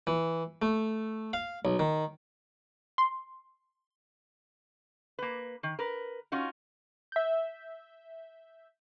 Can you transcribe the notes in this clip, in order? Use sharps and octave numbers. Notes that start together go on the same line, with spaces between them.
E3
A3
F5
B1
D#3
C6
A#3 B4
D#3
A#4 B4
C#4 D#4 F4 F#4
E5 G6